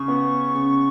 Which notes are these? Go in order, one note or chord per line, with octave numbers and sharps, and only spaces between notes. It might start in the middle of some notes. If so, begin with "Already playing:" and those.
Already playing: C#3 C#6
B3
C#3